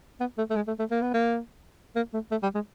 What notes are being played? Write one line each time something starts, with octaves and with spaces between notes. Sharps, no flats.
B3
A3
A3
G#3
A3
A3
A#3
B3
A#3
A#3
A3
A3
G3
G#3